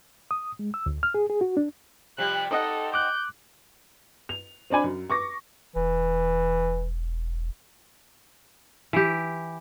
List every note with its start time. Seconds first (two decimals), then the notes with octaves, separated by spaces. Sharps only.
0.31 D#6
0.59 G#3
0.74 E6
0.86 D2
1.03 F6
1.14 G#4
1.30 G#4
1.41 F#4
1.57 D4
2.18 C3 F3 G3 F#6
2.51 C4 D#4 A4 D5 D#5 F#5
2.94 D6 F#6 G6
4.29 F7
4.70 C4 D4 D5 G#5 B5
4.84 F#2
5.10 C#6 D6 A#6
5.76 E1 E3
8.93 E3 G4